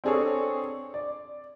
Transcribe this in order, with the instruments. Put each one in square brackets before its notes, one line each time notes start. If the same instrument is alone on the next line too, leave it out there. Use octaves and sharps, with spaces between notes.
[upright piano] C4 D4 G#4 A4 C#5
D5